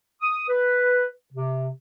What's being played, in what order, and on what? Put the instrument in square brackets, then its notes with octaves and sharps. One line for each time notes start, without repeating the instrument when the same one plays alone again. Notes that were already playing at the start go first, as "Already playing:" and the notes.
[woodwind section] D#6
B4
C3